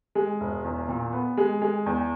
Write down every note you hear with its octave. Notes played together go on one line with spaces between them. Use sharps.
G#3
E1
E2
A#2
B3
G#3
G#3
E2